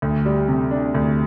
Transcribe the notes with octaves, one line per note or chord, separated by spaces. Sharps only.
D2
G3
C3
D4
D2